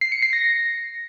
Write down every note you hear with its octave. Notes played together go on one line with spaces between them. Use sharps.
C7
C#7
C7
A#6